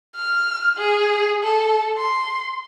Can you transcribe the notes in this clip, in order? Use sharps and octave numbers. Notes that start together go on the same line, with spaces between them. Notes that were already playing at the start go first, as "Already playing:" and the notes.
F6
G#4
A4
C6